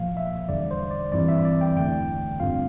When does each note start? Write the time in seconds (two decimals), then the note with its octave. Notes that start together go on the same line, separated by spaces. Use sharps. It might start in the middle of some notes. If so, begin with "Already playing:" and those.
Already playing: A#2 F3 A#3 F5
0.17 E5
0.49 E2 D3 G3 D5
0.71 C5
0.91 D5
1.12 G2 E3 G3 C4 E4 D5
1.28 E5
1.45 D5
1.61 G5
1.76 E2 D3 A3 G5
2.40 G2 D3 G3 C4 F4 F5